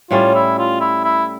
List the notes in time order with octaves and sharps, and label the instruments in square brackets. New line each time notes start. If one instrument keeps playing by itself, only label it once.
[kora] A2 G3 C#4 [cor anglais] F4
[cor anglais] E4
F4
E4
E4